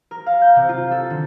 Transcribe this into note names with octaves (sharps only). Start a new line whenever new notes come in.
A#4
F5
G6
C3
F4
A4
D3